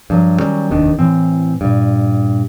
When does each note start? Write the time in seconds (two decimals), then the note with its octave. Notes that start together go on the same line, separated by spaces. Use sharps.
0.10 G2 F3 F#3
0.40 D#3 F#3 G3 C#4
0.70 F1 D#2 D#3 D4
0.99 A2 E3 C4
1.61 G2 A#2